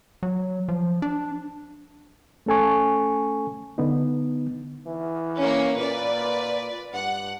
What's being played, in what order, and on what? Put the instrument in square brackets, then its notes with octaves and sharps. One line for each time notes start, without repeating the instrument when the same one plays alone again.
[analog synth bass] F#3
F3
D4
[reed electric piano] A3 C#4 A4 G#5 C#6
D3 B3 D#4
[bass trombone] E3
[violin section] A#3 C#4
[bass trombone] A#2 [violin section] B4 D5
[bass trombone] G2 [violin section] F#5